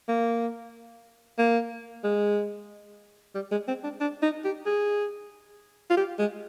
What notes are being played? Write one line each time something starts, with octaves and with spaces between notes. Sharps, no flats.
A#3
A#3
G#3
G3
G#3
C4
D4
D4
D#4
G4
G#4
F4
G4
G#3